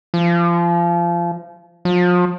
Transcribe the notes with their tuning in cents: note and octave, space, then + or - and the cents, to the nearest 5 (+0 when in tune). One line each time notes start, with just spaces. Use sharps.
F3 -25
F3 +35